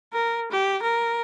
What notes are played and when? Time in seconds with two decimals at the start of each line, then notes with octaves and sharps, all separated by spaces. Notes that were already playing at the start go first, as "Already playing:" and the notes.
0.13 A#4
0.51 G4
0.82 A#4